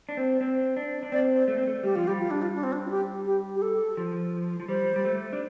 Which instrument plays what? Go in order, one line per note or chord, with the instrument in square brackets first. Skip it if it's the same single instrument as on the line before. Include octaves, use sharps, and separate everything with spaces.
[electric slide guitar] D4
C4
C4
D4
D4
[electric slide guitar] C4 [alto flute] D5
[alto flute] C5
[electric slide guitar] A3
C4
A3
[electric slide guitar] G3 [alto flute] G4
[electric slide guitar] F3 [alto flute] F4
[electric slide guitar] G3 [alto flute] G4
[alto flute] F4
D4
F4
D4
C4
D4
F4
G4
G4
G4
A4
[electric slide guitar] F3
F3
[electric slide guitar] G3 [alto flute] C5
[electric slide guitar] G3
A3
D4